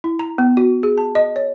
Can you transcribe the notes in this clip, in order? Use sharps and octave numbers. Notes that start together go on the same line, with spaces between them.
E4
A#5
B3
F#4
G#4
A5
D#5
C#5